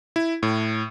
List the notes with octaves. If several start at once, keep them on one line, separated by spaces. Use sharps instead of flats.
E4
A2